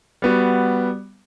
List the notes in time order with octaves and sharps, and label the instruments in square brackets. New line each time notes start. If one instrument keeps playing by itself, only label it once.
[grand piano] G3 B3 F#4